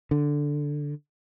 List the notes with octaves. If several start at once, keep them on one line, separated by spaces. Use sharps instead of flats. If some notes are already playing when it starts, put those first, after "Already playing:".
D3